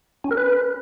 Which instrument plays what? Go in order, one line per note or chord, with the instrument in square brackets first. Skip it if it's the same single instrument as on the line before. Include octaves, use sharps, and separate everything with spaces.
[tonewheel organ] C#4
A#4
B4